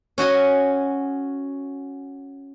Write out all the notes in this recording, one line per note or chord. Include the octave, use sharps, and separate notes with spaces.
C#4 F#4 D#5 G#5